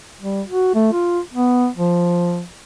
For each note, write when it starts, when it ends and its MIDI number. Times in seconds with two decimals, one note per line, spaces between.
0.21 0.42 55
0.47 0.73 66
0.75 0.88 57
0.93 1.20 65
1.33 1.68 59
1.77 2.44 53